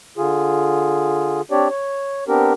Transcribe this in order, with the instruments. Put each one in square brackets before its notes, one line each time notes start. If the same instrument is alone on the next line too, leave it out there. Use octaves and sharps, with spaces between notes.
[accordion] D3 F4 G#4
C4 D4 G4 C#5 D5
C#5
B3 C4 D4 G4 A#4